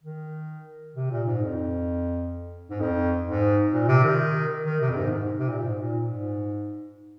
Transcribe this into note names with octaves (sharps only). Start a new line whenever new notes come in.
D#3
C3
A#2
G#2
F2
G#2
F2
G#2
A#2
C3
D#3
D#3
C3
F2
G#2
G#2
C3
A#2
G#2
A#2
G#2